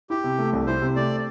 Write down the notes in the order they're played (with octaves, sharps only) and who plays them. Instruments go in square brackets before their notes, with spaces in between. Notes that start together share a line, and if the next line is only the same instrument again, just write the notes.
[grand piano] E4 [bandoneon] G4
[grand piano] C3
A3
C2
[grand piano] E4 [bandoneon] C5
[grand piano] C3
[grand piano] A3 [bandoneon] D5